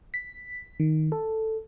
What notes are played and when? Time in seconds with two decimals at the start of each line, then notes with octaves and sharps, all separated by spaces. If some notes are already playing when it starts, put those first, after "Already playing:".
0.14 B6
0.80 D#3
1.12 A4